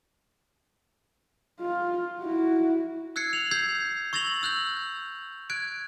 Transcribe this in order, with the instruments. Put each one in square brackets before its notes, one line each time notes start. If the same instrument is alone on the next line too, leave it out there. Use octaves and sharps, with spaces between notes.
[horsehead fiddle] F4
E4 F#4
[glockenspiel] E6 F#6 G#6 C7 C#7
F7 F#7
E6 G6 G#6 C7
C#6 E6 A6 A#6 F7 F#7
E6 F#6 G6 F#7
F#6 G#6 D7